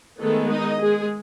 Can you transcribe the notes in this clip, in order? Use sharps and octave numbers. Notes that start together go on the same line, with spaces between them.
D#3 G#3 A3 B3 A4
D#4 D#5
G#3 G#4